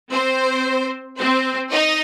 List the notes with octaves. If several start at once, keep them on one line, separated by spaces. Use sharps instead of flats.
C4 C5
C4 C5
D#4 D#5